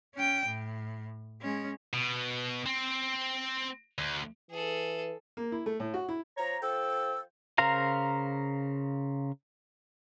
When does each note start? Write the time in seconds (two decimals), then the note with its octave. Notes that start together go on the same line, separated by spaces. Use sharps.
0.15 C#4 G5
0.46 A2
1.42 G#3 C#4
1.93 B2
2.66 C4
3.98 D2
4.51 E3 G#4 A4
5.37 A#3
5.52 E4
5.66 A3
5.80 A2
5.94 F#4
6.09 E4
6.37 F3 C#5 A#5
6.62 F3 A4 G5 E6
7.58 C#3 A#4 C5 F5 A#5